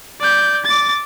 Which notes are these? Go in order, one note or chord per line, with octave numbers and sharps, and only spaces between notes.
D5 G6
D6 A6